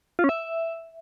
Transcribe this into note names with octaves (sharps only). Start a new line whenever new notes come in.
F4
C#4
E5